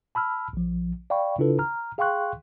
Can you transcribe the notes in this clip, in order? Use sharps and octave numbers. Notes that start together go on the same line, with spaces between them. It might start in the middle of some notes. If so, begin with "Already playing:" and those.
A5 B5 E6 F6
A#1 F3
D5 F5 G5 B5 C#6
C#3 D4 E4 F4 A4 B4
A#5 F6
G#4 F5 G5 C6 C#6 F#6